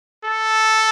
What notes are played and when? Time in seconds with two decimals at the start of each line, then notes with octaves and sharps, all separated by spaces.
0.24 A4